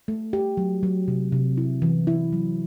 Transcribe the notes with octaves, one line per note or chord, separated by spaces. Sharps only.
A3
G4
F#3
F#3
C3
C3
E4
E3
E4
F#3